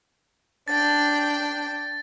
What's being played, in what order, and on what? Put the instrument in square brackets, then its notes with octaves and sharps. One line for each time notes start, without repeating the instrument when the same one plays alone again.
[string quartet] D4 G5 [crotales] A6